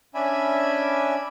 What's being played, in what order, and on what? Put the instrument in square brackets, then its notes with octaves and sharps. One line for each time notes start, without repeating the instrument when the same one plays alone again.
[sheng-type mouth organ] C#4 D4 D5 E5 G#5 B5